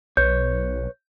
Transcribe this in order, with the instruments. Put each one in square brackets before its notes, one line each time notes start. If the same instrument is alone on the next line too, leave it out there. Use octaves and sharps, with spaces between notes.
[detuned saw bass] B1 [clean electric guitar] B4 C#5 [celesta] G6